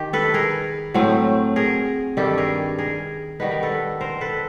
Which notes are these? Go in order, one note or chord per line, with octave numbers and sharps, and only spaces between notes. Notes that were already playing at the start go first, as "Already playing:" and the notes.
Already playing: D#3 G4
A4 B4
G#4 A#4
A2 F#3 A3 C4
G#4 A#4
G2 D#3 G3 G4 A4
G#4 A#4
G#4 A#4
D#3 G3 B3 D#4 B4
A#4
A4 B4
A#4 C5
A4 B4